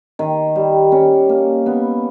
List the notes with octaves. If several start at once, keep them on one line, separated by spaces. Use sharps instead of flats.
D#3
G3
C#4
A#3
B3